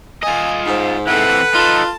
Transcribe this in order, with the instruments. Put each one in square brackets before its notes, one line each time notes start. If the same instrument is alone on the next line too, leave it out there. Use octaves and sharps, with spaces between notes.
[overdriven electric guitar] F4 D#5 [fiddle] G#5
[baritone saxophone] G#2 [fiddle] C5
[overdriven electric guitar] E3 C4 [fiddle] A4 F#5 [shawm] B4
[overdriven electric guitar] D#4 A4 [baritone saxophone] F4 [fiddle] A5